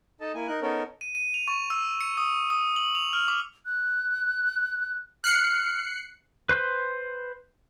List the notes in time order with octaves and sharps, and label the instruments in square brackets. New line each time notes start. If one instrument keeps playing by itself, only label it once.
[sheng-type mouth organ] D#4 A4 D#5 A5
A#3 E4 G#5
D#4 A#4 F#6
B3 C#4 D#4 A4 A#4 C#5
[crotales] D#7
D#7
F7
C#6
E6
C#7
D#6
D#6
F#7
F7
F6
D6
[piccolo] F#6
[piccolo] F6 [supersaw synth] F#6 C7 C#7
[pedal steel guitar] B4 C5 C6